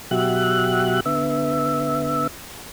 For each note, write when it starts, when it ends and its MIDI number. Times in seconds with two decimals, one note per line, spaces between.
0.11 1.00 47
0.11 1.00 54
0.11 1.00 66
0.11 1.00 67
0.11 1.00 76
0.11 1.00 90
1.06 2.27 50
1.06 2.27 59
1.06 2.27 76